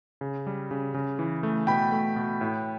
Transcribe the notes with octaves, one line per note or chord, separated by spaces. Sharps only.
C#3
G3
C#3
C#3
E3
A3
B2 G5 B5
A3
B2
A2